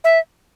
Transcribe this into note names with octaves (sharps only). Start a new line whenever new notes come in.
E5